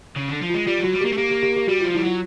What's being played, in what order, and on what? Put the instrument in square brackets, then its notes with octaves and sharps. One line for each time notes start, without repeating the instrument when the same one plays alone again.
[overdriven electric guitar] C#3
D3
F3
[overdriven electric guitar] G#3 [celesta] F4
[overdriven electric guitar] G3 [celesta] F4
[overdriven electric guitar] F#3 [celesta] F#4
[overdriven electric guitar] G3
[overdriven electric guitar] A#3 [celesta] G4
[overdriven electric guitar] A3
[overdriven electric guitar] A#3 [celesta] G4
[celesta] G4
G4
G4
[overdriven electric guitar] G3 [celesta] F#4
[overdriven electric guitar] F3 [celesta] F4
[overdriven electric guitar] G3 [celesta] E4
[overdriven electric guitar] F#3 [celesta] F4